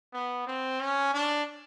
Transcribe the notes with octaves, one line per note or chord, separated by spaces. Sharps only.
B3
C4
C#4
D4